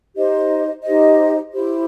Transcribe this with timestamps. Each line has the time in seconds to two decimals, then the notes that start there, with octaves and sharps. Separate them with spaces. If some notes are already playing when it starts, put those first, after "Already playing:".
0.15 D#4 G4 C5 D#5
0.83 D#4 G4 C5 D#5
1.52 E4 G4 C5